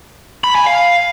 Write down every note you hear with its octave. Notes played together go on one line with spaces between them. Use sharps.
B5
G#5
F5